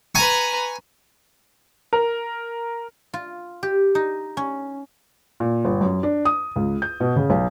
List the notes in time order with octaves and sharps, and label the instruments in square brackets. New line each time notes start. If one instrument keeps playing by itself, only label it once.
[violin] B4 A#5 [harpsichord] G#5 C#6
[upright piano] A#4
[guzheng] F4
G4
D#4
C#4
[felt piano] A#2
G1
F#2
D4
D#6
C#2
G6
B2
C#3
B1